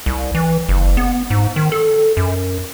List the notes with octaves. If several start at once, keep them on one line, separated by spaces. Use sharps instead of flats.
C2
E3
F#1
B3
G#2
D#3
A4
F#2